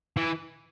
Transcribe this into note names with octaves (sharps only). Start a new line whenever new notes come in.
E3